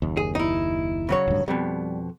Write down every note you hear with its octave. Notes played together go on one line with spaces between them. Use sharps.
F#1 D#2
G#4
D#4 E4
C#3 F#3 C#5
D1 G2
F2 B2 G3